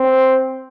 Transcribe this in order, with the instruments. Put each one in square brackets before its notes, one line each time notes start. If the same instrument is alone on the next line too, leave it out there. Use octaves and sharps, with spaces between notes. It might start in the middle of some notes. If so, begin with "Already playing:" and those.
Already playing: [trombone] C4